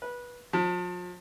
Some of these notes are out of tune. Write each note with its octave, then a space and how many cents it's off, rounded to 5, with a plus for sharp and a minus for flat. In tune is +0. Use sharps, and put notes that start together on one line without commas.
B4 -20
F3 +40